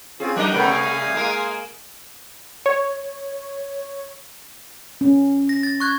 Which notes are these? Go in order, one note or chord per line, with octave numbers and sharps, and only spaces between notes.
C4 C#4 F4 G#4
F#3 D4 D#4 A#4 D#5 F#6
C3 G3 A3 B3 C#4 G5
F5 G#5 D#6
G#3 A#3 A#4
C#5
C#4
A#6
A6
C#6 F#6 G#6